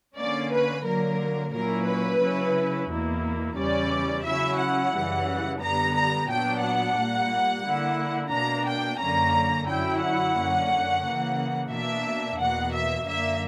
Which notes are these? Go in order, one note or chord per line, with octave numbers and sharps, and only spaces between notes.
D3 A#3 C#4 D5
B4
D3 F#3 A#3 A#4
A#2 F#3 A#3 C#4 E4 A#4
B4
C#3 F#3 C#4 E4
E2 B2 A#3 E4
E2 C#3 E3 G3 C#4 D5
C#3 F#3 C#4 E4 E5
F#5
F#2 C#3 E3 G3
D3 G3 B3 A#5
A#5
A#2 F#3 B3 D4 G5
F#5
A#2 G3 A#3
D3 A#3 E4
B2 A#3 D4 A#5
G5
F#2 D3 A#3 C#4 A#5
F#2 D3 F#3 C#4 E4 G5
F#5
F#2 D3 A#3 C#4
C#3 E3 A#3
B2 A#3 D4 E5
E2 B2 A#3 F#5
E5
F#2 D3 A#3 E5